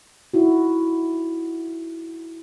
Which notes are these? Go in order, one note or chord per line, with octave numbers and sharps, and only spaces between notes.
D#4 E4 F#4